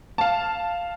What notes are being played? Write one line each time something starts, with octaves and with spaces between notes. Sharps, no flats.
F5 A5